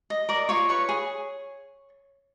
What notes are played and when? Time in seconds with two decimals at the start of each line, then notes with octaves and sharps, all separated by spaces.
0.10 D#5
0.29 A#4 D5 D6
0.49 F4 C#5 C#6
0.69 B4 C#5 C#6
0.89 G#4